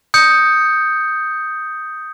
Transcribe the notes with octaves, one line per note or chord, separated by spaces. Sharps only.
D#6 G6 C#7